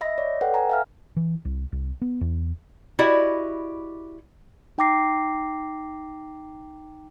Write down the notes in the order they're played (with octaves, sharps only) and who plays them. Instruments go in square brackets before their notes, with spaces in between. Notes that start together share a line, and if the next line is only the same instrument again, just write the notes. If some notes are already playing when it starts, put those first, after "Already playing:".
[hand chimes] D#5 E5 B5 A#6
C#5 D5
A4 B4 F#5 G5
G#5 A#5
E5 F5 F6
[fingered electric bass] E3
C2
C2
B3
E2
[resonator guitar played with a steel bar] E4 F#4 G4 D5 D#5
[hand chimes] D#4 G5 A#5 D6 A#6 C7